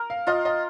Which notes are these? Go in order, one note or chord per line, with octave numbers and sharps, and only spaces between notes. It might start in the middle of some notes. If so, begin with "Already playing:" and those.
Already playing: A#4
F5
F4 D#5
D#5